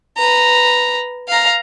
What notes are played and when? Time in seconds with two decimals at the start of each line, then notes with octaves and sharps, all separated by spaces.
0.18 B4 A#5
1.28 F5 A#5